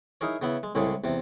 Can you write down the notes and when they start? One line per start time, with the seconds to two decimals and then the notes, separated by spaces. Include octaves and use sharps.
0.21 D#4 E4 G#4 A#4 C#5
0.42 C#3 B3 E4
0.63 G#3
0.75 C2 A2 C#3 G#3 G#4
1.04 E2 C3